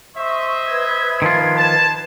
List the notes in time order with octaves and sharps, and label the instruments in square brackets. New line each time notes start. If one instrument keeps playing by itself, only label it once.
[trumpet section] C5 D#5 E5 [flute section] C#6
[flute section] B4 G#6
[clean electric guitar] D#3 F3 F4
[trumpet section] A5